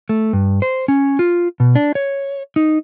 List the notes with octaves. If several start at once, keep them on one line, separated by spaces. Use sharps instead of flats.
A3
G2
C5
C#4
F4
B2
D4
C#5
D#4